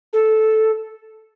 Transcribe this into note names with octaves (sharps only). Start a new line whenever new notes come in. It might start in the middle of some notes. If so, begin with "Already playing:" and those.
A4